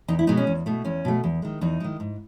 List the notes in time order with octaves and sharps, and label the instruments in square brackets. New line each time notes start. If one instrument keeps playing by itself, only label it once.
[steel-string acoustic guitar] E2 D#4
E4
B2 G#3 B3 D#4
C#4
E2
B2 A3
E2 C#4
B2 A3
E2
D#3 G#3
E2 D#4
D#3 G#3
G#2